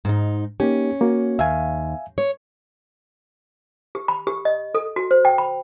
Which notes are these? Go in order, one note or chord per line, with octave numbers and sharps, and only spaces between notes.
G#2 D#4
A#3 C#4 D#4 G4
A#3 F#4
D#2 E5 F5 G#5
C#5
G4
B5
G4
D#5
A4
F#4
C5
G5
B5